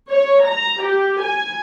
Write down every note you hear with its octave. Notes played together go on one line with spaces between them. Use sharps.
C#5
A#5
G4
G#5